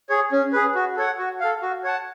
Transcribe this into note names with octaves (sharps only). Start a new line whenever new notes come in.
G#4 C#5
C#4
G#4 B4
F#4
A4 C#5 F#5
F#4
A4 F5
F#4
C#5 F#5 A5